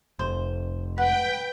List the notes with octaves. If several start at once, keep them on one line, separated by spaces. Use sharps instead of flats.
F1 C5
B4 F#5 G5